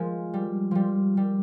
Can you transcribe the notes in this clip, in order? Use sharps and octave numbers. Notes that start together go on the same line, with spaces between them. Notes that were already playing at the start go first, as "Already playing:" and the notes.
Already playing: F3 G#3
G3
F3 G3
G3